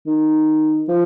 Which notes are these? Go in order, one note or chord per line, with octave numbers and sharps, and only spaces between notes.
D#3
F3